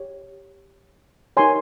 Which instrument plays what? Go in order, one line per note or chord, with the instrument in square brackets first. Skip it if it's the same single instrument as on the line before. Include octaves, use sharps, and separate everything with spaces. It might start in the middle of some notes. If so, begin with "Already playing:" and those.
Already playing: [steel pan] G4 C#5
D#4 G4 A#4 C#5 G#5 C6